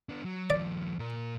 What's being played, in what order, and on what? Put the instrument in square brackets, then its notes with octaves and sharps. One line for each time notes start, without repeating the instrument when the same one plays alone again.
[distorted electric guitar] B3 D4
F#3
[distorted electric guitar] D#2 F3 [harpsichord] D5
[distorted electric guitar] A#2 A#4